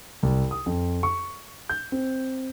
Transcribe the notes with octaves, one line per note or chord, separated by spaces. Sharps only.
C2
D#6
F2
C#6
G6
C4